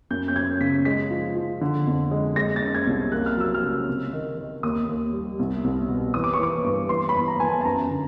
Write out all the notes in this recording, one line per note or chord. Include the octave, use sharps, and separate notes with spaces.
F#2 G6
G6
F#2 G#6
C#3 B6
G#3 B6
F3
F3
D3
F2
G#3
G#3 A#6
A6
C#4
G#6
C2
A#3 F#6
F6
F#3 E6
F6
C#2
C3
D#3
D#3
D#2 D#6
D#2
G3
C2
C2
B2
E3 D#6
D6
C#6
E3 D6
G2
E3 C6
B5
E2
A#5
E3 G#5
A5
A5
F#2 A#5
D3